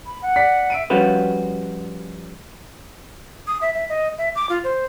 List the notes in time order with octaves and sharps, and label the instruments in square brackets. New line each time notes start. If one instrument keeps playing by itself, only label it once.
[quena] B5
F#5
[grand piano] D5 B6
E5 D7 D#7
[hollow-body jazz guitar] F3 G3 C#4 F4 F#4 B4
[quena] D#6
E5
E5
D#5
E5
D6
F4
C5